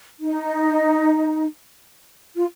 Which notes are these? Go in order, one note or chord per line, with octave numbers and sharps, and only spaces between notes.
D#4
F4